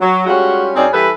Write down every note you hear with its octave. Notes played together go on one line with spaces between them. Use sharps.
F#3
G3 G#3 C#4 F4 F#4
F#2 C4 C#4 D#4 G#4 D5
E3 G3 A4 B4